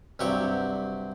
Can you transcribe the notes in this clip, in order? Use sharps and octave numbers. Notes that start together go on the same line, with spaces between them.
G2 C3 F#3 G4 C#6